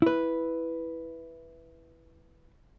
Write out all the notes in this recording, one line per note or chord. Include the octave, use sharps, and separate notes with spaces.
E4 B4